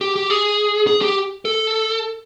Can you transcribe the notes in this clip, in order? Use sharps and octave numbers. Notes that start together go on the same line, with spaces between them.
G4
G4
G#4
G#4
G4
A4